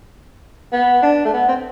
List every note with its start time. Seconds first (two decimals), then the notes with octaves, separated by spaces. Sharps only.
0.73 B3
1.02 D4
1.25 A3
1.34 B3
1.49 C4